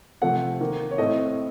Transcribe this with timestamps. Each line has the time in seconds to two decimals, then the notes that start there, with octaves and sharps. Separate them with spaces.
0.22 C3 F3 A3 C4 F#5
0.61 D#3 A#3
0.91 C#5
0.98 A2 A3 C4 D#5